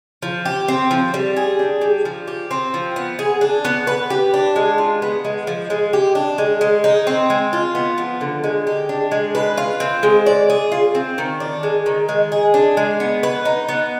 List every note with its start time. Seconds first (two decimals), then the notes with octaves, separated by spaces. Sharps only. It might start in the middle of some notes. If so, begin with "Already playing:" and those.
0.22 F3
0.45 G4
0.68 C4
0.91 F3
1.14 G3
1.37 G#4
1.59 D4
1.81 G3
2.05 F3
2.27 G4
2.51 C4
2.74 F3
2.96 B3
3.19 G#4
3.41 D4
3.65 B3
3.87 B4
4.10 G4
4.34 D4
4.56 G#3
4.78 F4
5.02 B3
5.25 G#3
5.47 F3
5.70 G#3
5.93 G4
6.15 D4
6.38 G#3
6.61 G#3
6.84 D#4
7.07 C4
7.30 G#3
7.53 F4
7.75 B3
7.98 F3
8.21 D3
8.44 G#3
8.67 G4
8.89 D4
9.12 G#3
9.35 B4
9.57 F4
9.80 C4
10.03 G#3
10.26 D5
10.50 G#4
10.72 F4
10.95 C4
11.18 D#3
11.40 D4
11.63 G#3
11.86 D#3
12.09 G#3
12.32 G#4
12.54 D4
12.77 G#3
13.00 B3
13.23 B4
13.45 D#4
13.69 B3